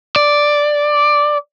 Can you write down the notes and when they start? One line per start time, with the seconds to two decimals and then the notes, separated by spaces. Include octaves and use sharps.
0.16 D5